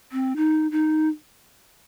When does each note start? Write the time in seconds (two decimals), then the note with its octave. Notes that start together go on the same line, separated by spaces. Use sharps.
0.12 C4
0.36 D#4
0.71 D#4